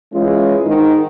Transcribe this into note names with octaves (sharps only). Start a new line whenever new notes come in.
E3 G#3 C#4 F4
G#2 D#3 D#4